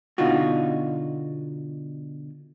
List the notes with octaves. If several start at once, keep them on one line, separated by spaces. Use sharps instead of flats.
B2 D3 D#4 F4 F#4